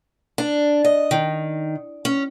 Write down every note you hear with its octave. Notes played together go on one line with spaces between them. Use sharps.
D4
D#5
D#3
C#4